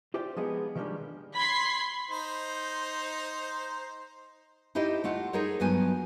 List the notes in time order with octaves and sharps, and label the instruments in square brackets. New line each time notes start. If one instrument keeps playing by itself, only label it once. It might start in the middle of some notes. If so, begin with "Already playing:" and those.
[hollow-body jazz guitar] F4 G4 C5 D5 E5 G5
F3 G#3 B3 D#4 G#4 D#5
D#3 F3 G3 G#3 A#3 D4
[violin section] B5 C6 G#6 B6 C7
[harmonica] D#4 C5
[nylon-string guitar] D#4 E4 G4 C5 D#5
A3 F4 F#5
D#4 G#4 A#4 C5 C#5
G2 F3 F#3 B3 G#5